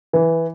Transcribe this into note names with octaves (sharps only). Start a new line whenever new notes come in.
E3